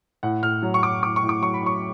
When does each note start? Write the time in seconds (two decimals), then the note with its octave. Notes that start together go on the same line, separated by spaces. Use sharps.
0.23 A2 F#5
0.43 A2 F6
0.63 F#3
0.74 C#6
0.83 F#3 D6
1.03 A2 D6
1.16 C#6
1.23 A2
1.29 D6
1.42 F#3 C#6
1.54 B5
1.63 F#3 C#6